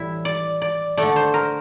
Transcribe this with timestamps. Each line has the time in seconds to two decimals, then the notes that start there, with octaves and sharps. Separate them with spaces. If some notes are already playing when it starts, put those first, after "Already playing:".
Already playing: A2 E3 G3 E4
0.25 D5
0.62 D5
0.97 D3 A3 D5
1.16 C5
1.34 A#4